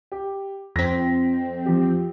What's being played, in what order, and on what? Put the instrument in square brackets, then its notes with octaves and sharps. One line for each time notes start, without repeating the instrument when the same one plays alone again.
[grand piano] G4
[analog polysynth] F2 C4 [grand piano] A#6 B6
[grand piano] F3 G4